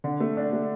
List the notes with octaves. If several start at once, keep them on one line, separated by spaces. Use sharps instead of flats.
D3
A3
D4
A3